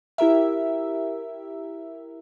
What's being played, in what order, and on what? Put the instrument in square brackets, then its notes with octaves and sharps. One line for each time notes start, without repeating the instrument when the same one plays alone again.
[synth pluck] E4 G4 A#4 E5